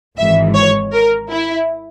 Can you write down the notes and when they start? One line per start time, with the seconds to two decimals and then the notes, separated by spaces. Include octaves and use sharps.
0.17 G#1 G#2 E3 E5
0.55 C#5
0.93 A#4
1.30 E4